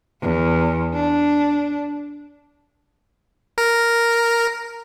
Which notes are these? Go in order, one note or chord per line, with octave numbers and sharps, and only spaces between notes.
E2
D4
A#4